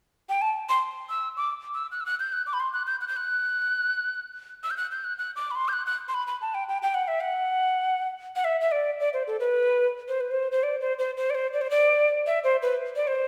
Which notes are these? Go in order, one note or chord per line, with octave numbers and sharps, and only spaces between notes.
G5
A5
C6
E6
D6
E6
F#6
E6
F#6
G6
F#6
D6
B5
C6
F#6
G6
F#6
G6
F#6
E6
G6
F#6
G6
F#6
F#6
D6
B5
C6
G6
F#6
F#6
C6
B5
B5
A5
G5
G5
G5
F#5
E5
F#5
F#5
E5
E5
D5
D5
C5
A4
B4
C5
B4
C5
C5
D5
C5
C5
C5
D5
C5
D5
C5
D5
E5
C5
B4
D5
C5